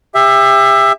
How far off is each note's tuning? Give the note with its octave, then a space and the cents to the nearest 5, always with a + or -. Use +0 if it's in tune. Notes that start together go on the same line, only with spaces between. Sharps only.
G4 +35 E5 +15